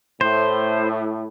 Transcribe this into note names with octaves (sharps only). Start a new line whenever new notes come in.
A2 C5